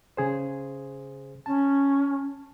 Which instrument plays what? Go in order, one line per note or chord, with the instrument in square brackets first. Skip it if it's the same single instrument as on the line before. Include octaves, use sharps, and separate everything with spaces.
[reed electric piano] C#3 G#4 C5
[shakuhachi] C#4 [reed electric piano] A5